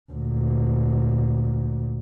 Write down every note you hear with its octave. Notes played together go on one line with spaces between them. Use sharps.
D2 A#2